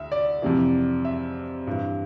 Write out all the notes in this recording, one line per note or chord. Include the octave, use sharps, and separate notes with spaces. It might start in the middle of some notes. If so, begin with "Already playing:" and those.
Already playing: D2 E5
D5
F2 C3 E3
E5
G2 E3